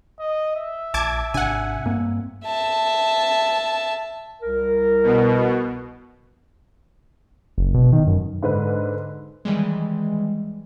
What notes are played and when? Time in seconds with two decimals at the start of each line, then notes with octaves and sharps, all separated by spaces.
0.20 D#5
0.56 E5
0.94 A#1 A5 D6 G#6
1.34 G#1 C3 D4 F#5 G#5
1.85 G2 A#3 C4
2.45 E5 A5
4.41 C2 A#4
5.03 B2
7.58 F#1
7.74 B2
7.92 D#3
8.07 F#2
8.43 G#2 D3 B4
9.45 D#3 E3 G3 G#3